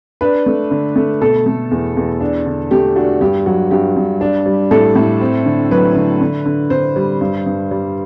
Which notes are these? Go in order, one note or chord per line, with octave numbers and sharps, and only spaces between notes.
D4 B4
A3
D3
A3
B2 A4
A3
E2
E2
D4
D3
A3 G4
D4 F#4
G2 G4
F#3 F#4
G2 G4
G2
D4
G3
A2 A4
A2
C4
D3
F#3 B4
D3
D3
D3
D3 C5
G3
G2
G2
G3